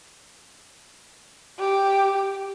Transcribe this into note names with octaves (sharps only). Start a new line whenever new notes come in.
G4